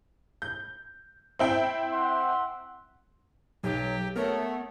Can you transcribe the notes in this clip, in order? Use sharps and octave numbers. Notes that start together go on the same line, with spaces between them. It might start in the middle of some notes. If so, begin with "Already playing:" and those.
G6
C4 E4 G5
E5 F#5 C6
B1 F#3 G4
A3 B3 A#4 C#5